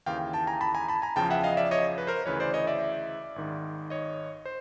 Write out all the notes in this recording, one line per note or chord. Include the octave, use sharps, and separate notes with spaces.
D#2 C#3 E3 F5 G5
G5 A5
G#5 A#5
A5 B5
G#5 A#5
A5 B5
G#5 A#5
E2 C#3 F3 G5 A5
E5 F#5
D#5 F5
D5 E5
C#5 D#5
B4
A#4 C5
D2 C#3 E3 B4 C#5
C5 D5
C#5 D#5
D5 E5
G#1 G#2 D#3
C#5 D#5
C5